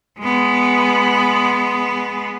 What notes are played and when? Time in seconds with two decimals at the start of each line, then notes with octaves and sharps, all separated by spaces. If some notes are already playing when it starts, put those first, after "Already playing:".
0.19 G#3 B3